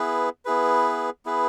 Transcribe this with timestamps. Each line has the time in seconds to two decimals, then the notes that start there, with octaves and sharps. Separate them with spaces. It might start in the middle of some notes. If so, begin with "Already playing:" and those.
Already playing: B3 E4 G#4 B4
0.45 B3 E4 G#4 B4
1.26 B3 E4 G#4 B4